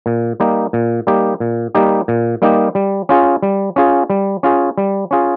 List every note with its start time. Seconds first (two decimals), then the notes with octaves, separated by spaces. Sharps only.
0.06 A#2
0.40 G3 A#3 D#4 G4
0.73 A#2
1.07 G3 A#3 D#4 G4
1.40 A#2
1.75 G3 A#3 D#4 G4
2.08 A#2
2.42 G3 A#3 D#4 G4
2.75 G3
3.09 C#4 F4 G#4
3.43 G3
3.76 C#4 F4 G#4
4.10 G3
4.43 C#4 F4 G#4
4.78 G3
5.11 C#4 F4 G#4